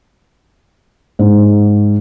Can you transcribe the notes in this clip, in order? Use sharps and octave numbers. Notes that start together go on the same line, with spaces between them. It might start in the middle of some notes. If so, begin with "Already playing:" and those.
G#2